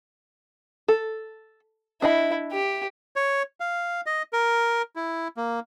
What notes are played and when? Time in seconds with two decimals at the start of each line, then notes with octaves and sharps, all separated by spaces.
0.88 A4
2.02 D4 E4 D#5 B5
2.52 G4
3.16 C#5
3.60 F5
4.06 D#5
4.33 A#4
4.96 E4
5.37 A#3